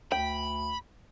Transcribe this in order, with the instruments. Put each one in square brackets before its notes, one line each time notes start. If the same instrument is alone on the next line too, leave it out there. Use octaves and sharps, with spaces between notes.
[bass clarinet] D2 [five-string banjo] G5 [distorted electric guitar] B5